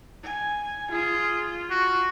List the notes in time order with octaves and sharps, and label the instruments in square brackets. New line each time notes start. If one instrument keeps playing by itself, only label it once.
[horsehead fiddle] G#5
[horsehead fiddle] F4 [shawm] G#4
[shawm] F#4